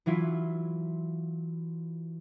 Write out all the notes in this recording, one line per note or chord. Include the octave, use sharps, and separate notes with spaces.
E3 F#3 E4 F4